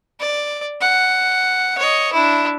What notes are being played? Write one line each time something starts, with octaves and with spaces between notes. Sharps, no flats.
D5
F#5
C#5 D#5
D4 E4